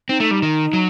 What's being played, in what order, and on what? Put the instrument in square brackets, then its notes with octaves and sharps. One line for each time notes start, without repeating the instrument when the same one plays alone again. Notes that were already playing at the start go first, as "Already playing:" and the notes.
[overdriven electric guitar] C4 [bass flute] D#4
[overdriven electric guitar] A3
G3
D#3
F#3